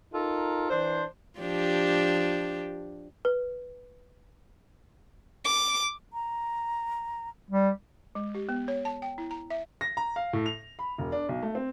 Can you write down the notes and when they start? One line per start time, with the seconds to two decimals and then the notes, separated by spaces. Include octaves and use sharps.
0.13 D#4 F4 A4 A#4
0.70 E3 D4 C5
1.39 F3 D4 G4
3.25 B4
5.45 D6
6.13 A#5
7.50 G3
8.15 G#3
8.35 G4
8.49 B3
8.68 C#5
8.85 A5
9.02 G5
9.18 E4
9.31 A#5
9.50 E5
9.81 A#6
9.97 A#5
10.16 F5
10.33 A2
10.46 F7
10.79 B5
10.98 E1
11.12 D4
11.29 B1
11.43 A3
11.55 C4